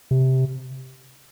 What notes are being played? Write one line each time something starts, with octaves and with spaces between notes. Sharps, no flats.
C3